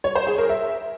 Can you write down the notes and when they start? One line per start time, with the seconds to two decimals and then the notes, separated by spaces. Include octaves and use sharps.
0.04 C#5
0.15 C5
0.27 G#4
0.38 A#4
0.49 E5